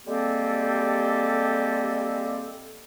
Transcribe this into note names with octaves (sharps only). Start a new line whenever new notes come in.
G3 G#3 A#3 C4 G4 A4